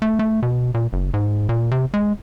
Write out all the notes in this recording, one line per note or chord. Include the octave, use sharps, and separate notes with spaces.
A3
A3
B2
A#2
F#1
G#2
A#2
C3
G#3